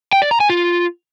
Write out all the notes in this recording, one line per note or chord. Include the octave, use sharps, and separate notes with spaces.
G5
D5
A#5
G#5
F4